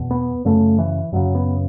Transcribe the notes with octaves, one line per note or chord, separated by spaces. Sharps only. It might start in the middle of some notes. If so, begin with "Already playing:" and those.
Already playing: E2 B2
B3
F#2 C#3 A3
E3
F#2 C#3 F#3
B3